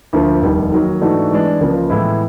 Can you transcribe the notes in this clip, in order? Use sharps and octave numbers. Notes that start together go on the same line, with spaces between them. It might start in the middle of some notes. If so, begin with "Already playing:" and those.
D2 D3 F3 A#3
F1 D#2 D#3 G3
D#3 F#3 A#3 D#4
G#2 E3 A3 D4 F#4
E3 G#3 B3 D4
C#2 C#3 F3 A#3
A2 E3 G#3 B3 E4